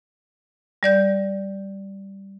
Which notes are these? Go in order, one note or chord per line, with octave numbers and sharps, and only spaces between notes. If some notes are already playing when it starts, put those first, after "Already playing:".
G3 D5 G6